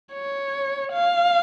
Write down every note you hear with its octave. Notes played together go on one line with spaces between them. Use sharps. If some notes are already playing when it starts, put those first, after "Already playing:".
C#5
F5